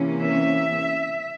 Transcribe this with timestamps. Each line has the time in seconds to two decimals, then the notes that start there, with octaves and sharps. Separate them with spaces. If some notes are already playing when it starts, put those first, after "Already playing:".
Already playing: C3 E3 A#3 C#4
0.21 E5